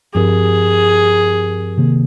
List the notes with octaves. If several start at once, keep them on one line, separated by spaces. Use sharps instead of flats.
G2 F3 C4 G4 G#4 A#4
C3 D#3 A#3